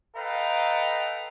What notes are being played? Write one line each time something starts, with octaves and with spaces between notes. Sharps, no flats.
A4 B4 D#5 F5 G5 A#5